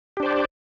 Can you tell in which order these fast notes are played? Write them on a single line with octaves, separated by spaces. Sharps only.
G4 D4 C5 D5